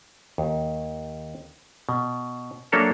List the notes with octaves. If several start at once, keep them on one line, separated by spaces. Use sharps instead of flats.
D#2
B2
F#3 A#3 D4 A4 C#5 E5